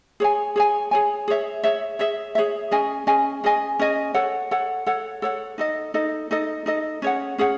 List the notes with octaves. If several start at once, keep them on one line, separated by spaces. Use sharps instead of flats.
G#4 C#5 G#5
G#4 C#5 G#5
G#4 C#5 G#5
G#4 C#5 E5
G#4 C#5 E5
G#4 C#5 E5
G#4 C#5 E5
C#4 G#4 D#5 G#5
C#4 G#4 D#5 G#5
C#4 G#4 D#5 G#5
C#4 G#4 D#5 G#5
A4 C#5 F#5
A4 C#5 F#5
A4 C#5 F#5
A4 C#5 F#5
D#4 A4 D#5
D#4 A4 D#5
D#4 A4 D#5
D#4 A4 D#5
C#4 G#4 C#5 F#5
C#4 G#4 C#5 F#5